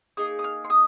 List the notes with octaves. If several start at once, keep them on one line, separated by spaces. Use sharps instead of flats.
A#3 D#4 G#4 D#6
D#6
F6
C6
D#6